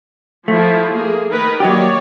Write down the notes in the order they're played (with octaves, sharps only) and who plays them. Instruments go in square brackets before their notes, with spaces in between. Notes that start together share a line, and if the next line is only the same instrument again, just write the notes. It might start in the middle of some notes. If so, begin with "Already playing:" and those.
[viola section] F3 E4 [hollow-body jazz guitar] A3
[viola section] A#3 G#4
D#3 A#4 B4
[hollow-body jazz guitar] F#3 D#4 G4 [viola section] A#3 C#5 D5